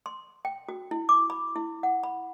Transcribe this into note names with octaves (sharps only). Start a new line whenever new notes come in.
C6
G5
F#4
E4
D6
B5
E4
F#5
B5